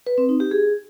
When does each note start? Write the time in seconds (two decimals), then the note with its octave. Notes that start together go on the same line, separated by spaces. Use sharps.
0.07 B4
0.18 C4
0.29 D#4
0.40 G4
0.51 G#4